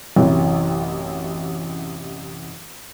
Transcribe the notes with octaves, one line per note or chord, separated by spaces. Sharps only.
A1 F#2 C3 E3